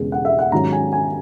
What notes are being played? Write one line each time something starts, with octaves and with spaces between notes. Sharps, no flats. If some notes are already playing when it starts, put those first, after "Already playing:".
Already playing: E1 E2 C#3 G#3
F#5
E5
F#5
G#2 D#3 F#3 C#4 A#5
G#5
G#5